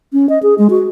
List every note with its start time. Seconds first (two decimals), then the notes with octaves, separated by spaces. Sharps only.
0.13 C#4
0.29 D#5
0.43 G#4
0.58 G#3
0.70 F#4